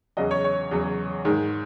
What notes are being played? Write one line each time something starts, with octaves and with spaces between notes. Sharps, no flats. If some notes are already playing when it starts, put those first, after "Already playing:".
E2 C#3 F#3 D#5
C#5
C#5
E2 C#3 F#3
G#2 D#3 G#3